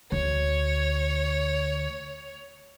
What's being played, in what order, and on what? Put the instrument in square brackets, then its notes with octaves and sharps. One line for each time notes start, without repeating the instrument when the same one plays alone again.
[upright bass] D2 [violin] C#5